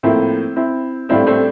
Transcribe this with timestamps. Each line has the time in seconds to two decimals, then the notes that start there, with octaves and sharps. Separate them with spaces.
0.03 A2 F3 A#3 C4 E4
0.56 C4 E4
1.09 A2 G3 C4 D4 E4 F4
1.27 A3 C4